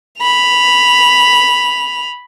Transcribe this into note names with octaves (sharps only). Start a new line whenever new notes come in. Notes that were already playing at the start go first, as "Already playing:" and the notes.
B5 F7